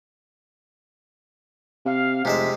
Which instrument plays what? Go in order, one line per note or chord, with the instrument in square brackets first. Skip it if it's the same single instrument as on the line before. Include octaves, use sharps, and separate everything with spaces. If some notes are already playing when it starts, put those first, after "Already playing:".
[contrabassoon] C3 [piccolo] F5
[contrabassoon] F1 [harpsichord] C3 G#3 E5 [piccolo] B6